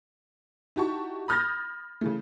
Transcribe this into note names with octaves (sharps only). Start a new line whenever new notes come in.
D#4 E4 F#4 G4 A5 C#6
B5 D#6 F6 G6 A6 A#6
C#3 E3 A3